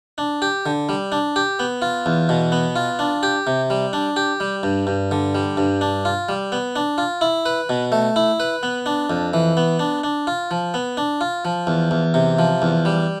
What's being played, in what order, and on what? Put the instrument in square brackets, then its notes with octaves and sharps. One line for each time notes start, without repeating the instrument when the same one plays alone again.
[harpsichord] D4
G4
D3
G3
D4
G4
B3
F4
E2
B2
B3
F4
D4
G4
C3
G3
D4
G4
G3
G2
G2
D3
G3
G2
D4
F4
G3
B3
D4
F4
E4
B4
B2
A3
E4
B4
B3
D4
F2
E3
B3
D4
D4
F4
F3
B3
D4
F4
F3
E2
E2
C3
F3
E2
G3